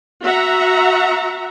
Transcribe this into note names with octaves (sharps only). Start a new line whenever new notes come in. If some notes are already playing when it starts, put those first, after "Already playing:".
F#4 E5 F#5 A#5